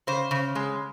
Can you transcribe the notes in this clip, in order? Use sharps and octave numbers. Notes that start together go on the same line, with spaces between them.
C#3 C5
C#3
G#3